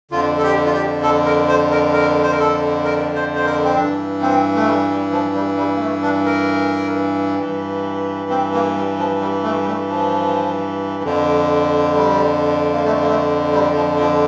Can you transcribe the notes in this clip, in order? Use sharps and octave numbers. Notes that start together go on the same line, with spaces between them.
F2 D3 F4
A4
G4
F4
G4
A4
A#4
C5
A#4
A#4
C5
A#4
A4
A#4
C5
C5
A#4
C4
G2 E3 D4
C4
A3
G3
G3
F3
G3
G3
A#3
A3
D4
A#4
G2 E3
C4
A#3
G3
F3
G3
A3
G3
A3
F3
F2 D3
G3
A#3
A3
A#3
A3
G3
F3
F3